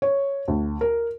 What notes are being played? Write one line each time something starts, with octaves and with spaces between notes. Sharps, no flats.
C#5
D2
A#4